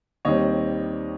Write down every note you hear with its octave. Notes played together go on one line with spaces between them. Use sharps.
D#2 D#3 G3 C4 C#5 D#5